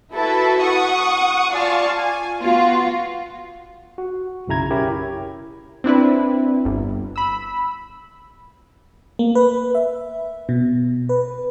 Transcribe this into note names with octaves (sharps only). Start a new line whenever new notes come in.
E4 F#4 A4 B4 E5
F#5 C#6 D#6
F4 D5 F5 G#5 A5 C#6
G#5
B3 F4 F#4
F#4
B1 F#2 C#3 E4 A#5 G#6
C#4 E4 G4 A#4 C#5
C4 D4 E4 B4
G1
B5 E6
A#3
B4
E5
B2
B4